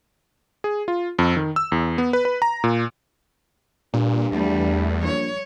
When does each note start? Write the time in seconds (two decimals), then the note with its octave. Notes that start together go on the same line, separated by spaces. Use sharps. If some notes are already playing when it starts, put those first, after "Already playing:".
0.64 G#4
0.88 F4
1.19 F2
1.37 D#3
1.56 E6
1.72 E2
1.98 B3
2.13 B4
2.25 B4
2.42 A#5
2.64 A#2
3.94 G2 A#2
4.32 E2 G3 A3
5.04 A#1 C#5